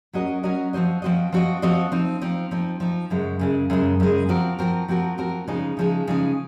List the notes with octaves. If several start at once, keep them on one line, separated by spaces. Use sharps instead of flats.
F#3 C#4 F#4 A#4 D#5
F#3 C#4 F#4 A#4 D#5
F3 C4 F#4 C5 D#5
F3 C4 F#4 C5 D#5
F3 C4 F#4 C5 D#5
F3 C4 F#4 C5 D#5
F3 C4 D#4
F3 C4 D#4
F3 C4 D#4
F3 C4 D#4
F#2 C#3 G#3
F#2 C#3 G#3
F#2 C#3 G#3
F#2 C#3 G#3
F3 C4 F#4 A#4
F3 C4 F#4 A#4
F3 C4 F#4 A#4
F3 C4 F#4 A#4
C#3 F3 G#3 D#4 G#4
C#3 F3 G#3 D#4 G#4
C#3 F3 G#3 D#4 G#4